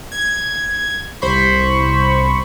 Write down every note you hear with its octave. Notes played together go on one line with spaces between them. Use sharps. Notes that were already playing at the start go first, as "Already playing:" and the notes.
G#6
C2 C5 B5 C#6